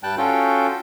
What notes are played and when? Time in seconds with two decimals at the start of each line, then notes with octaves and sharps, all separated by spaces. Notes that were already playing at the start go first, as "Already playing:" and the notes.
0.03 G2 G3 G5 A5 F#6
0.18 C#4 F4 F#4 A4 G5